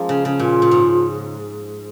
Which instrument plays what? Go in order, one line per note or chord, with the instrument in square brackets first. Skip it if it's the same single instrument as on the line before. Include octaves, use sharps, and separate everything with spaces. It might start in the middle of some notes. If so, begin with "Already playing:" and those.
Already playing: [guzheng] F3 G#3 A#3 C#4
C#3
C#3
[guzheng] A#2 [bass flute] F4
[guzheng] A#2
G#2